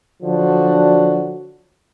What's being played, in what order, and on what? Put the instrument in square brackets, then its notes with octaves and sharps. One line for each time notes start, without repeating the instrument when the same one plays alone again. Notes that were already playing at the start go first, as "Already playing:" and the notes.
[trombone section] D3 F3 F#3 D4 F#4